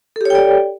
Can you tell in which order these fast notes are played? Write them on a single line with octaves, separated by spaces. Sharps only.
A4 G4 C#5 G5 D5